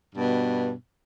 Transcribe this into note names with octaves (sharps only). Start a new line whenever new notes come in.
G2 B2